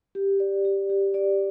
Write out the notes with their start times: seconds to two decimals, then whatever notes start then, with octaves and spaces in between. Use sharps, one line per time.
0.15 G4
0.40 D5
0.65 G4
0.90 G4
1.14 D5